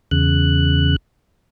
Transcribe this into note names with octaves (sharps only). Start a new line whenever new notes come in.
E2 C#3 F#6